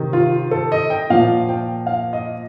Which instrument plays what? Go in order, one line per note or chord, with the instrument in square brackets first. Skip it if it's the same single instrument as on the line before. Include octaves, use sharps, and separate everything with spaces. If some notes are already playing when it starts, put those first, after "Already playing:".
Already playing: [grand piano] C3 D#3
F4
A4
D#5
G5
A#2 F3 F5
G5
F5
D#5